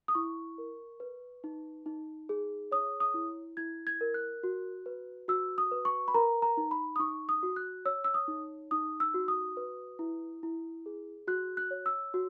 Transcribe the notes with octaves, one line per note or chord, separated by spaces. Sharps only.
D#6
E4 C#6
A#4
B4
D#4
D#4
G#4
C#5 D#6
D#6
E4
E4 G#6
G#6
A#4
F#6
F#4
B4
F#4 E6
D#6
B4
C#6
B5
A#4 A#5
A#5
D#4
B5
D#6
D#4 C#6
D#6
F#4
F#6
C#5 E6
E6
D#6
D#4
D#4 D#6
E6
F#4
D#6
B4
E4
E4
G#4
F#4 F#6
F#6
C#5
E6
F#4